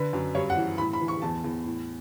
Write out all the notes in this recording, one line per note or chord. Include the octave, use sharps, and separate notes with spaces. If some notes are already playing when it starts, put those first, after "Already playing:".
Already playing: D3 B4
F#2
G2 C#5
F#5
E3
A2 B5
B5
E3
C#6
E2 A5
E2
A2